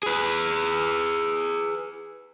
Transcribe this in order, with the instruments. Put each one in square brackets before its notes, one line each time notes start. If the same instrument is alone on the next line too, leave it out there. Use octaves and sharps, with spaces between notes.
[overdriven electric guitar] G#4 B4